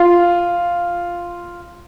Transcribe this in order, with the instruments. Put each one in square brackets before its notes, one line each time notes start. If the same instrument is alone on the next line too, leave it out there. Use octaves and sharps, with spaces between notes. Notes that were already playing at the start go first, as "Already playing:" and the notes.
Already playing: [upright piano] F4